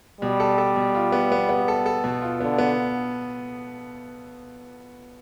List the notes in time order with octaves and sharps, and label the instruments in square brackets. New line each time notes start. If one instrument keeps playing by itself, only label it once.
[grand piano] B2 [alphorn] G3
[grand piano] A4
A4
B2
F4
B3
B3
B3
A4
A4
B2
F4
[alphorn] D3 [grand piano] B3
[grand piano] B3